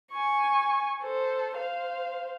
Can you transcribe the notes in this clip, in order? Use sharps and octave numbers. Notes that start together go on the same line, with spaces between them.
G#5 C#6
A4 C5
C5 F5